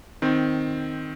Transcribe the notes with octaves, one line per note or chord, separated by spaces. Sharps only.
D#3 C4